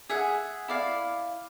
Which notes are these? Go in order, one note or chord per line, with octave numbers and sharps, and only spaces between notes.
G#4 E5 F#5
E4 D5 F5